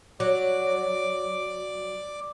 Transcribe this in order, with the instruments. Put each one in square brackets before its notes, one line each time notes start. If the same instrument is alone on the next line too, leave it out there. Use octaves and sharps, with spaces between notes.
[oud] F#3 [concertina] D5 D6